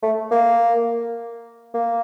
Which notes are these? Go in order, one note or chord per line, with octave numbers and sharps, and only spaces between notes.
A3
A#3
A#3